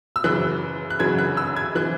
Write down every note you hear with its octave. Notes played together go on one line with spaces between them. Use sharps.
E6
F#2 C#3 E3 F#6
F#6
F#2 C#3 E3 G#6
F#6
E6
G#6
E3 F#6